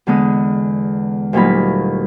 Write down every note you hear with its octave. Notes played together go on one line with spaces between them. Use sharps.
E2 D3 G#3 B3 D#6
D2 A#2 F#3 G3 D#4 B5